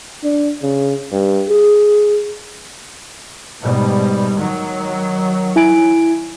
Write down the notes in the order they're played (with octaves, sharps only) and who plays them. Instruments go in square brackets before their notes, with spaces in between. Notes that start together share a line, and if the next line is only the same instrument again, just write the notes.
[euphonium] D4
C#3
G2
G#4
[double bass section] G#2 B2 G3
D#3 F#3
[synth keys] E4 G#5 D7